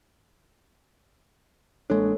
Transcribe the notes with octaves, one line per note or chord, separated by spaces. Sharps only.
A1 G#3 A#3 D4 A4 C#5